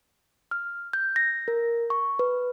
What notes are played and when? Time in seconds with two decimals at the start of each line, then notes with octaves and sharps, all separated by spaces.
0.51 F6
0.93 G6
1.16 A#6
1.48 A#4
1.90 C#6
2.19 B4